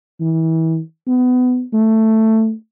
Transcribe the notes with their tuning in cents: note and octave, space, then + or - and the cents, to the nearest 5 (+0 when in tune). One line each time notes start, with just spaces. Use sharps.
E3 -30
B3 +25
A3 +10